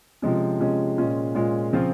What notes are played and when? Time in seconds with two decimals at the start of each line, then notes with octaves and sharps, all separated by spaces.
0.22 C3 F3 G#3 C#4
0.60 C3 F3 G#3 C#4
0.98 A#2 G#3 C#4 F4
1.35 A#2 G#3 C#4 F4
1.73 C#3 F3 C4 F4